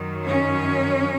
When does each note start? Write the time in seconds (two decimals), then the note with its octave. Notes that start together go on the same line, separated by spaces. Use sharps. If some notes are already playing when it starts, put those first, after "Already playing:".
Already playing: F#2 D#3 F#3
0.26 C#4